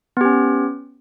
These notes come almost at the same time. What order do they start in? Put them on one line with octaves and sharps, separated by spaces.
B3 G4 C#4